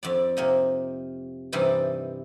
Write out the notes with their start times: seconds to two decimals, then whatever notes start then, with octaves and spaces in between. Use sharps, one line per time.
0.03 F2 D4 D5
0.37 C3 A#3 D#4
1.52 G2 C3 E3 D#4 D5